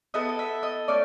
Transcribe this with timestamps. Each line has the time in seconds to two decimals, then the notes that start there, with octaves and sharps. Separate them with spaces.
0.14 B3 E4 A4 D#5
0.29 D#5
0.39 E5
0.63 D#5
0.88 A3 C#4 D5